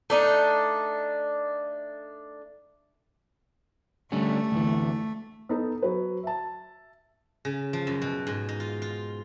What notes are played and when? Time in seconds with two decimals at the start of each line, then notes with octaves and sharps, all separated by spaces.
0.10 A3 D4 D#4
4.12 D3 G3 A3 C#4
4.52 D2 E3
5.49 B3 D#4 A4
5.83 F#3 B4
6.23 E5 A5
7.45 C#3
7.73 F3
7.87 F#2
8.02 B2
8.27 G#2
8.49 D#4
8.60 F4
8.82 F4